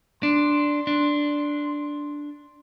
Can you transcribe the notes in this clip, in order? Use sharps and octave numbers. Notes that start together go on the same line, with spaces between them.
D4 C6
D4